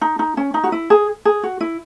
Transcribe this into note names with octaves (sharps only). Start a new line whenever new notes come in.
D#4
D#4
C#4
D#4
F#4
E4
G#4
G#4
F#4
E4